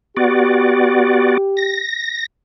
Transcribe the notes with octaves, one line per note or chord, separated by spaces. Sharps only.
B3 F#4 G4 D5
A#6